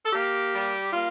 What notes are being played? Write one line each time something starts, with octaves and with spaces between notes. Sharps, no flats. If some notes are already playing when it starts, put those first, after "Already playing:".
A4
A#3 G4
G3
A#3 F4